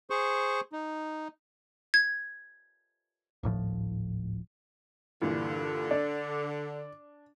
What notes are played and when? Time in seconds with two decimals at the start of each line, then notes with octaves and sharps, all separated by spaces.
0.10 G#4 C5 C#6
0.72 D#4
1.94 G#6
3.43 D1 G#1 A2 F3
5.22 G2 A#2 D3 E3
5.91 D4 D5